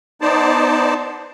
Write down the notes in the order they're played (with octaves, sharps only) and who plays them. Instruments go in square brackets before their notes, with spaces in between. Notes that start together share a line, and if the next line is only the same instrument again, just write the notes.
[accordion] B3 D#4 C5 D5 A5